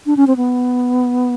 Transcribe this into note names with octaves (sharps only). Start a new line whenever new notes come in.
D4
C#4
C4
B3